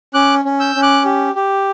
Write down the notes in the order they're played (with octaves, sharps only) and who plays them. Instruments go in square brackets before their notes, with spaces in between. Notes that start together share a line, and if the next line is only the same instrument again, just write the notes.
[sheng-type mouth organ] C#4 D6 F#6
C#4
E6 G6
C#4
D6 F#6
G4
G4